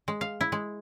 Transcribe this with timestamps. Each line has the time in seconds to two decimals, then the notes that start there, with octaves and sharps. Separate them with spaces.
0.08 G#3
0.21 F5
0.41 E4
0.52 G#3